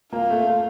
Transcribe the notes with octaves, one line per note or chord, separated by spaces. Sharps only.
A#3 F4
A3
A3